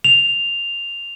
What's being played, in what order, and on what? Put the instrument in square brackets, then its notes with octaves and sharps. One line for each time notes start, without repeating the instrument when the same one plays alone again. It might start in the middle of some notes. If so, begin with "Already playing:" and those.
[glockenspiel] F7